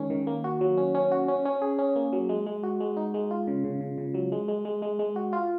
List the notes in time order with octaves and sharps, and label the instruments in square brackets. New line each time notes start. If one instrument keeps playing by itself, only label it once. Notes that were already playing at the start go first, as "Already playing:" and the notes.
Already playing: [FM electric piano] D#3 G#3 C#4
D#3
A#3
F#4
F#3
C#4
C#4
F#4
C#4
C#4
G#4
C#4
A#3
F#3
G#3
G#3
F#4
G#3
D#4
G#3
F4
C#3
C#3
C#3
C#3
F#3
G#3
G#3
G#3
G#3
G#3
F#4
F4